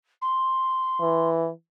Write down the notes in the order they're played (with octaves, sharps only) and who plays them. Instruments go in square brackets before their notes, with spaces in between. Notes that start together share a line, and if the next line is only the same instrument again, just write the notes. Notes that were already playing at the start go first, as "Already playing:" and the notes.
[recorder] C6
[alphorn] E3